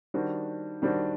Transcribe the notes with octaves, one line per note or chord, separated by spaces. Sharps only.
D#3 G3 D4 F#4 C5
D#3 G3 D4 F#4 C5